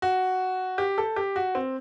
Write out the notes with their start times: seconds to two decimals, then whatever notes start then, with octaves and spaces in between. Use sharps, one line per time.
0.02 F#4
0.78 G4
0.98 A4
1.16 G4
1.36 F#4
1.55 C4